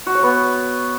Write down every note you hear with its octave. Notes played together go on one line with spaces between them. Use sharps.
F#4
C#5
B3